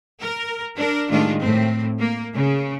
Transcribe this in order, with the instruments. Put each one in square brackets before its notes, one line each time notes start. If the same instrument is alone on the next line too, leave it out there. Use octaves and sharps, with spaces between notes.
[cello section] A#4
D4 A#4
A2 D#3 G3 G#3 D4 F4
A2 C4
A#3
C#3